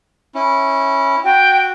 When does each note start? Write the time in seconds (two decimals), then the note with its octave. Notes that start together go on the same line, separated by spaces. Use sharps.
0.35 C#4 E4
1.24 F#4 G5